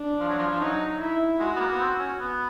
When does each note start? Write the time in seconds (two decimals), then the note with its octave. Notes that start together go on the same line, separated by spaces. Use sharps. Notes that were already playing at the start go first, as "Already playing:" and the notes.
Already playing: D4
0.20 F3
0.29 F#3
0.38 F3
0.51 F3
0.60 F#3 D#4
1.00 E4
1.40 G#3 F#4
1.56 B3
1.60 A#3
1.72 B3
1.80 C4
2.00 C#4
2.20 B3